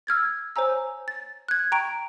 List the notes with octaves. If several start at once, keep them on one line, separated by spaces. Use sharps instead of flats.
E6 F6 G#6 A6
C5 C#5 G#5 A#5 E6
A6
F#6 G#6
G5 A#5 C#6 D7